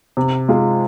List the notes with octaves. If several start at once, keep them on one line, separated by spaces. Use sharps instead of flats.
C3
G#3 F4 G#4